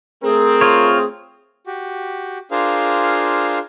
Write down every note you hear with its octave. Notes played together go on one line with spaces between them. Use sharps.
A3 C4 G#4 A#4
F4 C#5
F#4 G4
D4 F4 G#4 A#4 C5 F5